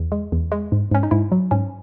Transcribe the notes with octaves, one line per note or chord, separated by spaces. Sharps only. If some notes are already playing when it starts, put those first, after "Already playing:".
Already playing: E2
G#3
E2
G#3
G#2
G#2 C#4
D#4
G#2 E4
F#3
G#2 C#4